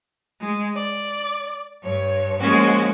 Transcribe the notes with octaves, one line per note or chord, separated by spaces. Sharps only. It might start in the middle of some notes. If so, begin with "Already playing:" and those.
G#3
D5
G2 C#5
F3 G#3 A#3 C#4 F#4